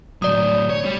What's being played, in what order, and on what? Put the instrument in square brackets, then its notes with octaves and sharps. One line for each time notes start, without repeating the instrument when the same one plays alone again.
[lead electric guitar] A2 F#3 [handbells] D5 D#6
[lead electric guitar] C#5
G3 G4